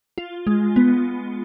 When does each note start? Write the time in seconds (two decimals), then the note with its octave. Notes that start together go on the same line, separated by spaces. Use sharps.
0.18 F4
0.47 G#3
0.76 B3